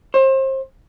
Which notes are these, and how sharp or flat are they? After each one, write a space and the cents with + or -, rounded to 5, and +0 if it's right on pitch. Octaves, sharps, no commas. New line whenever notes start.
C5 +30